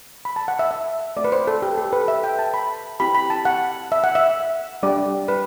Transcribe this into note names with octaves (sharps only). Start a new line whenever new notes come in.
B5
A5
F#5
E5
E5
A3 C4 F#4 D5
B4
C5
A4
G4
A4
B4
E5
G5
A5
B5
C4 E4 G4 B5
B5
A5
F#5
E5
F#5
E5
G3 D4 G4 D5
B4